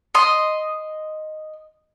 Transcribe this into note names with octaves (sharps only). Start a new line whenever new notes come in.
D#5 C6